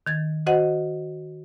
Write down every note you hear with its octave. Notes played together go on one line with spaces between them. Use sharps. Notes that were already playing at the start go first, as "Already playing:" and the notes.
D#3 G#6 A6
F#4 C5 D#5 F#5